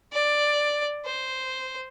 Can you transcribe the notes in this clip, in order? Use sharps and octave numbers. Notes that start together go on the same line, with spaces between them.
D5
C5